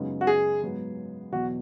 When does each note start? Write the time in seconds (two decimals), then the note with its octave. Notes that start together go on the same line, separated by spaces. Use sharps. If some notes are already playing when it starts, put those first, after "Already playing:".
Already playing: F#2 C#3 G#3 B3 D#4
0.21 F#4
0.27 G#4
0.62 G#2 F#3 B3
1.32 E2 B2 F#3 F#4